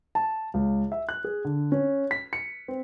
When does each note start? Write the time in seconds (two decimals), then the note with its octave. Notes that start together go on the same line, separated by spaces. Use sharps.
0.15 A5
0.54 C#2
0.92 E5
1.09 F#6
1.24 G#4
1.45 D3
1.72 C#4
2.11 B6
2.33 C#7
2.68 C4